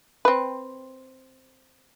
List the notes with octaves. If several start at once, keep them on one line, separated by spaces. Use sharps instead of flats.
C4 B4